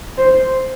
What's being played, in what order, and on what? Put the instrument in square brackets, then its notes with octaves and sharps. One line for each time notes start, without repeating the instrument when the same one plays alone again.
[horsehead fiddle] C5